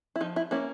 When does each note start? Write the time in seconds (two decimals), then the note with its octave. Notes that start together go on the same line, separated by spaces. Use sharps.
0.16 E4
0.21 F3 D#4
0.36 E4
0.51 A#3 C#4 E4